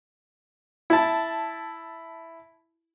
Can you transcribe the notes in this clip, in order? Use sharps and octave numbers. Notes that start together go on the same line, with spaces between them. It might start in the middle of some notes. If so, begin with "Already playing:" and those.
E4 A5